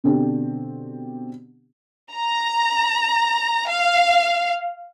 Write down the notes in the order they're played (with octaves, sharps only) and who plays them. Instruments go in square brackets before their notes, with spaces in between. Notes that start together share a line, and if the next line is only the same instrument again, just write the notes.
[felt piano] B2 D3 C4 D4 G4
[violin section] A#5
F5